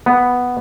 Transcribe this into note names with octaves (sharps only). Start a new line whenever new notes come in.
B3